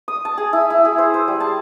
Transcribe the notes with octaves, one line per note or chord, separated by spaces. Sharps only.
D#6
A5
G#4
E4
E4
G#4
C5
C5
G3
A5